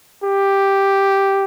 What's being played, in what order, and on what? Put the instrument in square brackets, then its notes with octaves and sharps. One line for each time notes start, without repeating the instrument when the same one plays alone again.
[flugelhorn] G4